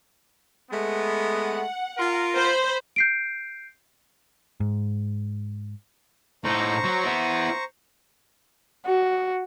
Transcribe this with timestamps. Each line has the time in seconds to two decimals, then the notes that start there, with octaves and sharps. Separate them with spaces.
0.71 G#3 A3 B3
1.38 F#5
1.98 F4 A#4
2.37 C5 B5
2.96 G6 C7 D7
4.60 G#2
6.44 A2 D#4 C5 A#5 C#6
6.84 F#3
7.04 B3 E4
8.86 F#4